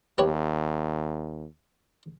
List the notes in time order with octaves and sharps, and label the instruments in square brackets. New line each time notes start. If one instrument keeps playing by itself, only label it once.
[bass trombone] D#2 [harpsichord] G4 B4 C#5